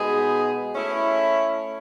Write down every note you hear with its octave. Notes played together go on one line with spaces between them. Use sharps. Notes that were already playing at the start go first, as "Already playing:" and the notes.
Already playing: B2 G#3 B3 D#4 G#4
A3 C#4 E4